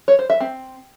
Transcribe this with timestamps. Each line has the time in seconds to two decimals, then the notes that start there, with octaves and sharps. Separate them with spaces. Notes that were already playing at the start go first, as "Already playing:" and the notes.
0.08 C#5
0.19 C5
0.30 E5
0.40 C4